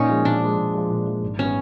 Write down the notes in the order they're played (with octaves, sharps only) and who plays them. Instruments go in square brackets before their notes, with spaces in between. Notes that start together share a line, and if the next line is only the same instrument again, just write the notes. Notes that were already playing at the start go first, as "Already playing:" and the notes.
Already playing: [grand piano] A#2 [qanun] C#4 D#4
[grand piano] F3 G#3
[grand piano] A#2 [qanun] D4
[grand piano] F3 G#3
A#2
F3 G#3
A#2
F3 G#3
G#1
[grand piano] E3 G3 B3 [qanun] C#4